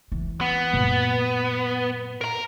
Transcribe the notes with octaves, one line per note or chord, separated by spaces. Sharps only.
E3
B3
F#2 A#2
A#4 A#5